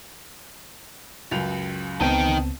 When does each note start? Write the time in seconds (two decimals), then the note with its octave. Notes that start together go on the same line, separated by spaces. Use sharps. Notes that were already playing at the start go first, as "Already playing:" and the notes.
1.31 C#2 F#2 F7
2.00 C#2 B3 C4 D#4 G5 A5 D#7